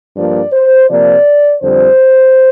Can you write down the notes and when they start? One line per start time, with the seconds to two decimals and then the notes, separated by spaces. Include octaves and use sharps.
0.15 G2 F3 A#3 D5
0.52 C5
0.89 C3 F3 A#3 D5
1.62 F2 D3 G3 C5